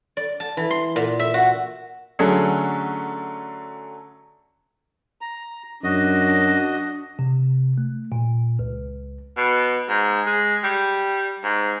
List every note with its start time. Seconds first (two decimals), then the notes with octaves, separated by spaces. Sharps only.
0.17 D5
0.40 A5
0.57 E3
0.70 C6
0.96 A#2
1.19 E5
1.34 F#4
2.19 D3 F#3 A3 C#4 G#4 A4
5.21 A#5
5.84 F#2 D4 F#4 D#5
7.19 C3
7.78 A3
8.12 A#2
8.59 C#2
9.37 B2
9.89 G#2
10.27 G#3
10.64 G3
11.44 G#2